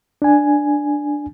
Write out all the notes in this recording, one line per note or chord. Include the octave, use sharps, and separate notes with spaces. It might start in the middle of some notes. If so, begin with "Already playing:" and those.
D4 G#5